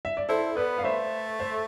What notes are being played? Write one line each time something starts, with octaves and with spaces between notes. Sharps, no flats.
E5
D5
E4 A4 C5
B3 B4 D5
F5
A3 C5 E5
C5 E5